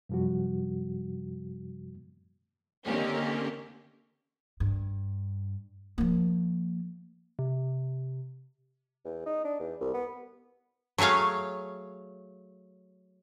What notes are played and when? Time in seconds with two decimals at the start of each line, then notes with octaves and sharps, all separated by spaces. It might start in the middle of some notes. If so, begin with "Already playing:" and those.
0.09 F#2 C3 F3 G3 F#4
2.85 D3 D#3 A#3 C4 C#4 G4
4.60 G2
5.98 F3 A#3
7.39 C3
9.05 E2
9.26 D#4
9.45 D4
9.60 E2
9.81 C2
9.94 B3
10.98 F#3 A3 G#4 C#5 F5